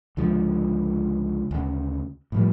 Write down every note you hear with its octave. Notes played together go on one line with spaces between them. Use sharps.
C#2 D3 F3 G#3
D2 C#3
A2 F3 G3